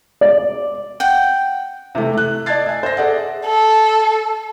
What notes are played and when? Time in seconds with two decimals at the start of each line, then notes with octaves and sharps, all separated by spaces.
0.21 D5
1.00 F#5 G5
1.95 C3 E3 A3
2.13 A3 F#6
2.46 D5 D#5 A5 G#6 A6 C7
2.66 E5 G#5
2.83 C5 E5 A#6
2.97 G#4 A4 D5 E5 F#5
3.46 A4